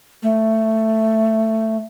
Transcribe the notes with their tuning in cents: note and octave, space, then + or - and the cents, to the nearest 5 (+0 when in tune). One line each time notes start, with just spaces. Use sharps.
A3 +10